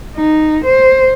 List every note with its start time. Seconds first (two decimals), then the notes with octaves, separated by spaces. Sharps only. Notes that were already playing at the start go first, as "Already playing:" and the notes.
0.16 D#4
0.65 C5